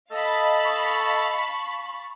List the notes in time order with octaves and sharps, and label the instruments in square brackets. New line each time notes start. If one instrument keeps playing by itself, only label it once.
[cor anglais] A4 [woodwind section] D#5 [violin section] F5 A5 B5
[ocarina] C#6